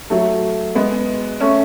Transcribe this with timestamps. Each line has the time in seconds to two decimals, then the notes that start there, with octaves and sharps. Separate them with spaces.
0.10 F#3 A3
0.75 G#3 B3
1.41 A3 C#4